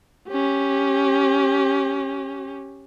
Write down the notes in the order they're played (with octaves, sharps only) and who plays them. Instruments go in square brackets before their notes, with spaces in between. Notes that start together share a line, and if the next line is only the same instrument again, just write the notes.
[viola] C#4 G4